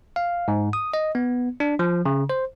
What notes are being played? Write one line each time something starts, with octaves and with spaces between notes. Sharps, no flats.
F5
G#2
D#6
D#5
B3
D4
F3
C#3
C5